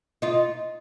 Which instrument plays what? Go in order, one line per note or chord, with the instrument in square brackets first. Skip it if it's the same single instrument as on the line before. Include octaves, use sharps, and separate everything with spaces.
[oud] D#4 F4